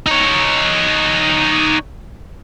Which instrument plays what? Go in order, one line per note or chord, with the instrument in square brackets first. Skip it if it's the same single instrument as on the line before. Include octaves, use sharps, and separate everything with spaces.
[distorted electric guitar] D#4 C#5